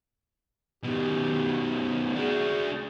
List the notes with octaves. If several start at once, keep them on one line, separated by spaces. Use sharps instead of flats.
B2 D#3 G4
D4 F#4 G#4